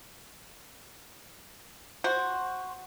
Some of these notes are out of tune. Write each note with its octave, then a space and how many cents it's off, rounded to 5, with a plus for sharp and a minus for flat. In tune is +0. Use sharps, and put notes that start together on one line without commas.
F#4 +0 C5 +10